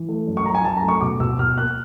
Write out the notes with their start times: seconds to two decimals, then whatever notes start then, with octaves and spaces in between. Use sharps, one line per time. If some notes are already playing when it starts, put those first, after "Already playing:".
Already playing: E3
0.09 A3
0.27 F#2
0.37 C#6
0.46 F#2 A#5
0.55 G#5
0.64 F#2 A5
0.77 A#5
0.82 A3
0.88 C#6
1.01 B2 D6
1.20 B2 E6
1.39 B2 F6
1.57 A#3 F#6